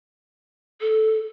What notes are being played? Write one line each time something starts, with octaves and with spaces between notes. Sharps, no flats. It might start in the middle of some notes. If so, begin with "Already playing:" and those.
A4